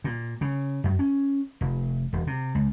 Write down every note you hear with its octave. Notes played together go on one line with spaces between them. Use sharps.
A#2
C#3
F#2
C#4
F1
E1
C3
C#2